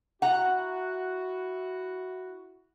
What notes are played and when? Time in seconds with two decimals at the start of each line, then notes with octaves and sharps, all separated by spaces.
0.22 E4 F#4 F#5 A#5